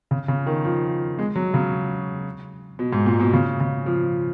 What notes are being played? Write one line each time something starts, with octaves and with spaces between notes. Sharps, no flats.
C#3
C#3
D#3
F3
G#3
F#3
C#3
B2
G#2
A#2
B2
C#3
C#3
F3